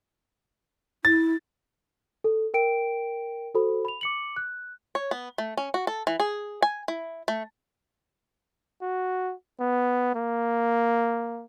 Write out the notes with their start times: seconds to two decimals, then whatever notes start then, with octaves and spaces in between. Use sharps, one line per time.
1.05 E4 A6
2.24 A4
2.54 A#4 G5 D7
3.54 F#4 A4 C5 B5
3.85 B5 F7
4.01 D6 C#7 F#7
4.36 F#6
4.95 C#5
5.11 B3
5.38 A3
5.57 C#4
5.74 F#4
5.87 A4
6.07 E3
6.20 G#4
6.62 G#5
6.88 E4
7.28 A3
8.82 F#4
9.60 B3
10.15 A#3